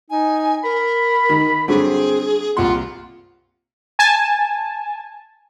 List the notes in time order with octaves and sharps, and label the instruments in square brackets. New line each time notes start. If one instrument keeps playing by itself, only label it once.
[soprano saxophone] D#4 [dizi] G#5
[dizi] A#4 [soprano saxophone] B5
[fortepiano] D#3
[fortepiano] G2 D3 F#3 [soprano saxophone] C4 [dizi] G#4
[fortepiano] C2 A#2 C6 [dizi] F4 [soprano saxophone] F#5
[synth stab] G#5 A5